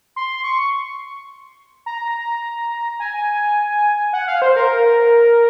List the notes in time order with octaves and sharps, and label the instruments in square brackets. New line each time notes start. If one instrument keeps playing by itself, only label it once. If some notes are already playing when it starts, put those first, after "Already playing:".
[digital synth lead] C6
C#6
A#5
G#5
F#5
F5
C5
A#4